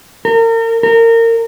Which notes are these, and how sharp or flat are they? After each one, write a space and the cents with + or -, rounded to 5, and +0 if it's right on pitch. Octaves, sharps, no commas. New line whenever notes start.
A#4 -35
A#4 -25